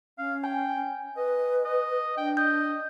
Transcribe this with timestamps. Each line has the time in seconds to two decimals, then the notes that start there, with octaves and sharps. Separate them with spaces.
0.18 C#4 F5
0.44 G5 G#5
1.17 B4 D#5
1.65 D#5
2.17 D4 G5
2.37 D#5 G6